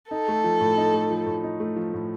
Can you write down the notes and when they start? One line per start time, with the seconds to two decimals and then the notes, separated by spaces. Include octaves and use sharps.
0.11 D#4 A4
0.28 A3
0.44 F3
0.61 A2
0.77 D#4
0.93 A3
1.10 F3
1.26 A2
1.44 D#4
1.60 A3
1.76 F3
1.94 A2